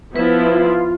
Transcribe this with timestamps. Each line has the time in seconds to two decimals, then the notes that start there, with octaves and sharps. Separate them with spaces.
0.16 F3 B3 E4 B4
0.50 F4